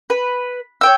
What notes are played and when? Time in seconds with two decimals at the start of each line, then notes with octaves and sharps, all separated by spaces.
0.10 B4
0.81 C#5 G5 E6